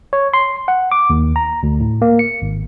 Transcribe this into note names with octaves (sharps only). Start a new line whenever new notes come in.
C#5
C6
F#5
D6
D#2
A#5
D2
A2
A#3
C#7
G#1